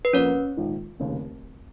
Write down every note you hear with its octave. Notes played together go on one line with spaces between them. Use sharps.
B4
F2 F3 A#3 C#4 C#5
A#1 G#2 D#3
F1 D#2 C#3